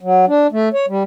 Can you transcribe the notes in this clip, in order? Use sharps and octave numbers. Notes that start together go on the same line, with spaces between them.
F#3
D4
A3
C#5
G3